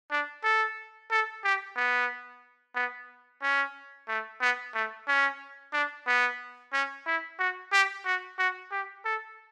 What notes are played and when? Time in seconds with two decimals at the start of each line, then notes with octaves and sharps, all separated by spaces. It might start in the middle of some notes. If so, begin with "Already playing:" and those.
0.11 D4
0.44 A4
1.11 A4
1.44 G4
1.76 B3
2.75 B3
3.42 C#4
4.08 A3
4.41 B3
4.75 A3
5.08 C#4
5.73 D4
6.07 B3
6.73 C#4
7.06 E4
7.39 F#4
7.72 G4
8.05 F#4
8.38 F#4
8.71 G4
9.05 A4